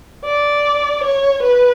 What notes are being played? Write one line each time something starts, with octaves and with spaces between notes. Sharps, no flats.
D5
C#5
B4